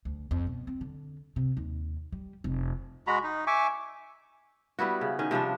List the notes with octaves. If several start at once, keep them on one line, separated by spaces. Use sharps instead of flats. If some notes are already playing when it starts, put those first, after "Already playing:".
D2
F2
B2
C4
D3
C3
D#2
G3
F1
G#3 F#4 A#5 B5
D#4
E5 G#5 C#6 D6
G3 B3 E4 F#4
C#3
D#3 C#4
C3 F3 G3 D4